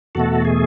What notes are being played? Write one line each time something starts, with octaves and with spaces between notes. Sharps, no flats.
E2 B2 A3 F#4 A4
G#4